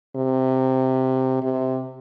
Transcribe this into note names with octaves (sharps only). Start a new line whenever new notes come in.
C3
C3